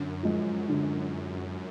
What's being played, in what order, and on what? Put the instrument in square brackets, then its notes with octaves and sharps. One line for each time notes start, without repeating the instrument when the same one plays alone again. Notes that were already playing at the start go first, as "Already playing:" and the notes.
Already playing: [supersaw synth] F#2 [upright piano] D3
[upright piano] F3 G#3
D3